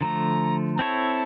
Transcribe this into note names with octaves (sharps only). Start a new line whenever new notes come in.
D3 F3 A3 A#5
A#5
C4 E4 A4 C#5 A5